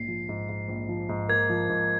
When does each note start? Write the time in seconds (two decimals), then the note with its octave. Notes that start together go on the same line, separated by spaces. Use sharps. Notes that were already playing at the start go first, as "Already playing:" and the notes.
Already playing: A#1 G#2 C7
0.08 F3
0.29 G#2
0.49 G#2
0.68 A#1
0.89 F3
1.09 G#2
1.29 A#3 G#6
1.49 F3
1.69 G#2